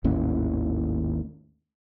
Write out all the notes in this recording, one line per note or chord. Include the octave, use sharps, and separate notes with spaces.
G#1 D#2 A2 C#4